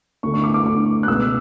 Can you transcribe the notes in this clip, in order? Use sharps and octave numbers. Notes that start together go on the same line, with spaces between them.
D2 D3 A3 C#6
C#6
D6
D6
D2 D3 A3 D6
F#6
C#2 B2 G#3 E6